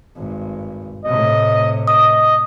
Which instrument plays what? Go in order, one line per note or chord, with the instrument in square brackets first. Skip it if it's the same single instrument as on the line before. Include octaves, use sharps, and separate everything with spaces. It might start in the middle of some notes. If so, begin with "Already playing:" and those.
[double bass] G#1 G2
[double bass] A2 C3 [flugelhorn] D#5
[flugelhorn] D#5 [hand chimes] D#6